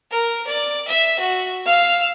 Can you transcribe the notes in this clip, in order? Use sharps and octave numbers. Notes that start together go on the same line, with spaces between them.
A#4
D5
E5
F#4
F5 E6